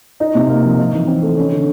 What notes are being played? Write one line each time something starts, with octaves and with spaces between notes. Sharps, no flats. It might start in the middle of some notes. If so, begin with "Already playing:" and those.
D#4
C3
A#3
F3
D#4
E3
C4
A3
C#4
D3